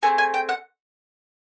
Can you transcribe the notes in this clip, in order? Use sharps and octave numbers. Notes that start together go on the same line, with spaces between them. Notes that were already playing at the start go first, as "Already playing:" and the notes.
A3 C4 G#4 G#5
G#5
G5
F#5